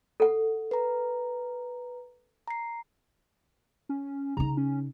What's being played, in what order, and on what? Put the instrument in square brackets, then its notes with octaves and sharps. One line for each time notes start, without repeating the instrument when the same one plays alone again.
[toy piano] A4 F#5
[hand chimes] B4 A#5
A#5 C7
[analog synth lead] C#4
[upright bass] C#3 D#4 [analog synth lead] A#5
[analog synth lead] C#4